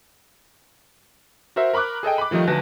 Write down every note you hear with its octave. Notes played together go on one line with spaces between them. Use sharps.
F#4 A#4 C5 E5
A#4 B5 C#6 D6 F#6
G#4 A4 D#5 G5
B5 D6
D#3 F3 G3 A3 D#4
D2 F#3 B4 A5 A#6